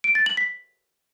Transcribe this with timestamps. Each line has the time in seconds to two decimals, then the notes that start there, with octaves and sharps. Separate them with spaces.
0.04 D7
0.15 A6
0.26 F#7
0.37 B6